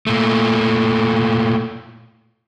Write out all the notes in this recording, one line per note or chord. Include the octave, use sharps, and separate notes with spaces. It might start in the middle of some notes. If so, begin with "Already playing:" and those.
A#2 A3